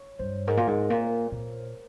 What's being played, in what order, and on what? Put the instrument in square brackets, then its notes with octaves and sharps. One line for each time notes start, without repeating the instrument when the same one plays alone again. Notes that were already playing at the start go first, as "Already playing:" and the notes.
Already playing: [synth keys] C#5
[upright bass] G2 [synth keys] C5
[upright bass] G#2 [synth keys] A#4
[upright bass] A#2
G#2
A#2
A#2